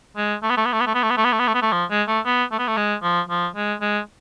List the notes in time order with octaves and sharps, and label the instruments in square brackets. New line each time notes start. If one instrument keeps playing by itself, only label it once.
[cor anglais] G#3
A3
B3
A3
B3
A3
B3
A3
B3
A3
B3
A3
B3
A3
B3
A3
B3
A3
F3
G#3
A3
B3
A3
B3
A3
G#3
F3
F3
G#3
G#3